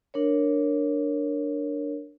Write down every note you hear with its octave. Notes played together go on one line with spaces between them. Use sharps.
D4 A#4 C#5